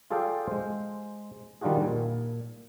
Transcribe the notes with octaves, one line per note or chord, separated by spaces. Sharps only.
F4 G#4 A4 D5 F5 G5
G#3 C5
D#3 G3 D4 F4 F#4 G#4
A#2